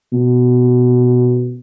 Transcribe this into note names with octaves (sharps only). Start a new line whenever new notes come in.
B2